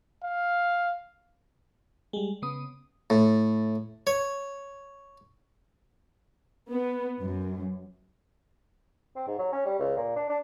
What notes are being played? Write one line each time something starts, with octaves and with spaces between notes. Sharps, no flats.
F5
G3 G#3
C#3 B3 D#6
A2
C#5
B3
F#2
C4
G#2
F#3
C#4
G3
C#2
A#2
D4
D4